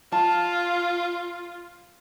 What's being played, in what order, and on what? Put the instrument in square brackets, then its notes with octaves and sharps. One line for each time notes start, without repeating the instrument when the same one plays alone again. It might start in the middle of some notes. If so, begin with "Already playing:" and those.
[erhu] F4 [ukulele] A5